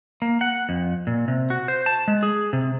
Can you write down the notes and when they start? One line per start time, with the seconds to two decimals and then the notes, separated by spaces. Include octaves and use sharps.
0.22 A#3
0.41 F#5
0.69 F2
1.07 A#2
1.28 C3
1.50 F#4
1.68 C5
1.86 A5
2.08 G#3
2.23 G#4
2.53 C3